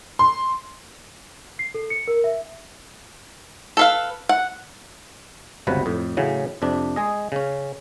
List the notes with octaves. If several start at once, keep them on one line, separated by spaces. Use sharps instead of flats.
C6
C7
A4
C#7
A#4
E5
A4 B4 F5
F#5
G1 C#2 C3 F#3 B4
F2 A2
A2 C#3 E3 F#3
F2 C3 D4
G#3 G#4 D#5
C#3 C#4